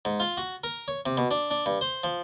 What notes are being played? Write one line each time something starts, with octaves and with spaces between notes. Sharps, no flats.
G#2
F4
F#4
A#4
C#5
C3
B2
D4
D4
G2
C5
F3